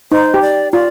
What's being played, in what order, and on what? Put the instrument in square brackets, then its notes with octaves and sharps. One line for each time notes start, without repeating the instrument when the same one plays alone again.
[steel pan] D#4 [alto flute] C5
[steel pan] G4
[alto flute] D5
[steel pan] F4 [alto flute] D5